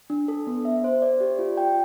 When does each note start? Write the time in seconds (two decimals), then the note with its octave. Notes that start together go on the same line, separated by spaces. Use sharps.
0.10 D4
0.28 A4
0.47 B3
0.65 E5
0.84 C5
1.02 D5
1.20 G4
1.39 F4
1.57 G5